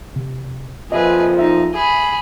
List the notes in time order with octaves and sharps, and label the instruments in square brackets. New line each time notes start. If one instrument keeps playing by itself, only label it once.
[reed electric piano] C3
[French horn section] F2 A#2 F3 [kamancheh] G#4 B4 [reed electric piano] D#5 E5
[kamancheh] D#4 [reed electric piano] E5
[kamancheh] G#4 B5